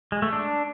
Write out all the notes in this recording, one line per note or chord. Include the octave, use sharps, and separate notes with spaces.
G#3
A3
D4